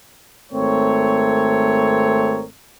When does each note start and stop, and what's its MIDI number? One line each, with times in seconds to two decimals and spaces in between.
0.53 2.44 32
0.53 2.44 57
0.53 2.44 60
0.53 2.44 70
0.53 2.44 73